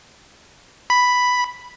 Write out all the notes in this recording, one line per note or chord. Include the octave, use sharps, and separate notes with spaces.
B5